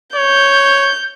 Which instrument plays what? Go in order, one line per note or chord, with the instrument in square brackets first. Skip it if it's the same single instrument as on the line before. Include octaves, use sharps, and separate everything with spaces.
[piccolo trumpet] C#5 [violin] G6